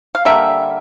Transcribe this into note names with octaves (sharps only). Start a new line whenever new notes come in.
F5
D3 G3 A#3 E5